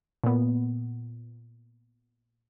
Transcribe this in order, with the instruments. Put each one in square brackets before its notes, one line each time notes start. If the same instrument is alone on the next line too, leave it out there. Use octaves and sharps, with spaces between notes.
[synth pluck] A#2 B3